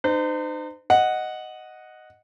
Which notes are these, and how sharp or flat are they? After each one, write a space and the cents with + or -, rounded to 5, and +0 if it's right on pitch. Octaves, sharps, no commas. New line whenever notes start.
D#4 -40 C5 -35
D#5 +0 F#5 +0